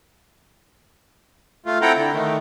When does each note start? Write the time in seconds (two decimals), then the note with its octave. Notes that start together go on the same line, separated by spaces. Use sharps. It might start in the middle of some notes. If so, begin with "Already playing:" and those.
1.66 A3 F4
1.82 C4 E4 A4 F#5 G5 A#5
1.96 D3
2.13 D#3 A3